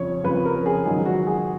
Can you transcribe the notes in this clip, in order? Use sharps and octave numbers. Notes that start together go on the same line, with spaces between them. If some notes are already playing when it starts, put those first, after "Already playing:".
Already playing: F2 C#3 F3 C#5
F2 C#3 F3 B4
A#4
G#4
G#2 D#3 F#3 G#4
F#4
G#4